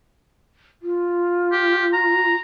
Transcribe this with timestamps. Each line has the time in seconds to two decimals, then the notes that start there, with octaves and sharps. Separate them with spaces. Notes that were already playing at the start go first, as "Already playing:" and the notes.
0.82 F4
1.52 G4
1.93 A#5